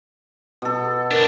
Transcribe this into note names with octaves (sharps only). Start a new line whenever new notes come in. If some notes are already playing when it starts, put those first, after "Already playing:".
B2 A4
C#2 D4 A#4